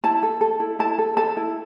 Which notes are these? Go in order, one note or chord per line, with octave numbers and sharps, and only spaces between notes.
E4 A5
A4
A4
E4
E4 A5
A4
A4 A5
E4